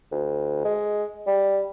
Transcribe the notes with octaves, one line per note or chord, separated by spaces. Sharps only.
D2
G#3
G3